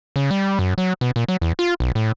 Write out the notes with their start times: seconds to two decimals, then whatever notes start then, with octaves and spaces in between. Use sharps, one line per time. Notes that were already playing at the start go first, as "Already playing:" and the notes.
0.16 C#3
0.31 G3
0.59 F#2
0.78 F#3
1.01 B2
1.16 A#2
1.28 F#3
1.42 E2
1.59 F4
1.80 B1
1.95 A2